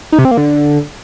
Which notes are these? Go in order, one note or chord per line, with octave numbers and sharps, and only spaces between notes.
D#4
C3
C4
A#3
D3